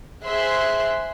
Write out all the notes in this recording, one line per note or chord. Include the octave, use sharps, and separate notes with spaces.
G#4 C5 E5 C6 F#6